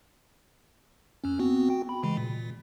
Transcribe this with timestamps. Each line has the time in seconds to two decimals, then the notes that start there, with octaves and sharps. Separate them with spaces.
1.24 F2 C#4
1.39 B3 C4 F#4
1.69 F#4 G5
1.89 B5
2.03 C#3 E3 G#3
2.17 A#2